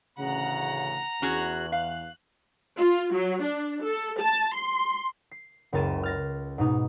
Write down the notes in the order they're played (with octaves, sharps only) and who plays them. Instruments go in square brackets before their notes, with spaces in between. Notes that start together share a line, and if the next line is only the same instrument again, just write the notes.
[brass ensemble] A1 D2 C#3 [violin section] F#5 [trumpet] A#5
[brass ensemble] E2 [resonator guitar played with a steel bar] C#4 F#4 G#4 [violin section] F#6
[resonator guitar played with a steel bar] F5
[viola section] F4
F#3
D4
A4
A5
C6
[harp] C7
F#1 C#2 A#4 A6 D#7 E7
F6 A6 A#6
G#2 B2 D#4